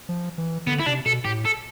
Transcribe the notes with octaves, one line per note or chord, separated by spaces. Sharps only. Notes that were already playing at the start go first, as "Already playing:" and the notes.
F3
E3
D3 B3
E4
C3 D4
B2 A4
A2 G4
A4